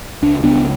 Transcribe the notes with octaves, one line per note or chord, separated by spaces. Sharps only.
C#2 D4
C#2 B3 D4